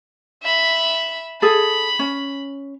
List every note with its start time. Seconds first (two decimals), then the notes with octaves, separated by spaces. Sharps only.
0.43 E5 B5
1.42 G#4 A4 B5
1.99 C#4